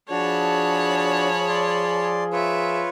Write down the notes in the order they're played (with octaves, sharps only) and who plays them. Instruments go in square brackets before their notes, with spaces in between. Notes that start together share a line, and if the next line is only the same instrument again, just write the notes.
[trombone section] F3 G#4 [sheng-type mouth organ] D4 F#4 [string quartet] C#5 A5 B5
[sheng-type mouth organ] D5 C6
[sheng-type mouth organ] F4 B4 C#5 [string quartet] E5